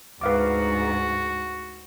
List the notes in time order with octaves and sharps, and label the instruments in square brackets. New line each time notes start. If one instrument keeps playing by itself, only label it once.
[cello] D2 G#2 [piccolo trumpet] F#4 [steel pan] B4 F5 D6